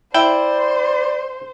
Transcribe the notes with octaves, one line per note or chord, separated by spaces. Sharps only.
E4 C5 D5 G5